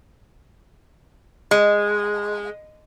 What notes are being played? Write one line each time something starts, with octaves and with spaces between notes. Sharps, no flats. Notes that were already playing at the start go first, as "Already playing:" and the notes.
G#3